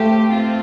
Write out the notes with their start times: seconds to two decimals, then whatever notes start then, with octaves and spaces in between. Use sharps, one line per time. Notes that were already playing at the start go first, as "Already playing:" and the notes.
Already playing: A3 G4 C5 F5
0.31 C4 F4